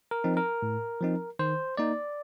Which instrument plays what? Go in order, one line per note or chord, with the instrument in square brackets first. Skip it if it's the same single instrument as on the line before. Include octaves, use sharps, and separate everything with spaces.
[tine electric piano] A#4
F3 C4 D#4
A#4
A2
F3 C4 D#4
D#3 C5
A#3 D#4 D5